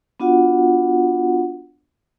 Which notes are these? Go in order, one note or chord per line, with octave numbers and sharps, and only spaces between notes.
B3 D4 F4 F#4 F#5